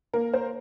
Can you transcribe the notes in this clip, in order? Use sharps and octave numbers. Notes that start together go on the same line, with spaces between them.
A#3 A#4
C5